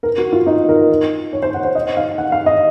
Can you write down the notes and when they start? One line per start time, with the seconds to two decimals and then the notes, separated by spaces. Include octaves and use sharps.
0.03 A#4
0.18 F#4
0.32 F4
0.47 D#4
0.69 A#4
1.33 C#5
1.42 C5
1.54 F#5
1.64 C5
1.75 D#5
1.97 F5
2.18 F#5
2.32 F5
2.46 D#5